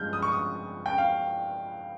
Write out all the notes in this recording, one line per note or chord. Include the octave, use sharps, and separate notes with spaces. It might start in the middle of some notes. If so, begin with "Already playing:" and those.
Already playing: G2 F3 G#3 F6 G6
D#6
C#6
D#6
G5
F5